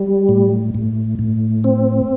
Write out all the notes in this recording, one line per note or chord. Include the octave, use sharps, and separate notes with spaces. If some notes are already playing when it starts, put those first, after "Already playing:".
Already playing: G3
A2
A2
A2
C4